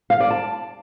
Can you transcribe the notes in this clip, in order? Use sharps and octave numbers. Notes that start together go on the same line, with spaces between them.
F5
D5
A5